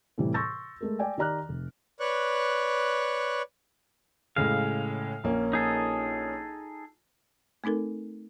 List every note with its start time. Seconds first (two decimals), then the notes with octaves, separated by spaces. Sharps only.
0.18 A2 C3 E3 G3
0.34 C6 C#6 E6 G6 A6 A#6
0.81 G#3 A3 A#4
0.99 D5 G5 G#5
1.17 D#3 G4 D5 A#5 F6 F#6
1.49 F1
2.00 B4 C#5 D5 C#6 F#6
4.36 A2 C#3 G#3 F5
5.24 A#1 A#3 C#4
5.53 D#4 G#4 A4
7.64 A3 C4 D#4 A4 A#4